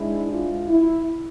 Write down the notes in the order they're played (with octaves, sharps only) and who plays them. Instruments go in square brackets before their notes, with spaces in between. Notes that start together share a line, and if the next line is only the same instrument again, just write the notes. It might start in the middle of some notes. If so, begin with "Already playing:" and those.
Already playing: [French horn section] G#2 G#3 D4 E4
F4
E4